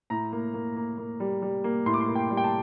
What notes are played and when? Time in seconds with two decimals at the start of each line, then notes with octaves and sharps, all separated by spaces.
0.10 A2 A#5
0.32 A#3
0.54 A#3
0.76 A#3
0.98 A#3
1.20 G3
1.42 G3
1.64 A#3
1.86 A2 C6
1.94 D6
2.01 C6
2.08 A#3
2.15 G5
2.30 G3
2.37 G5
2.44 A5